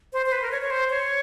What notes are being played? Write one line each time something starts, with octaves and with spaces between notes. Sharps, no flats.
C5
C5
B4
A#4
C#5
C#5
C5
C#5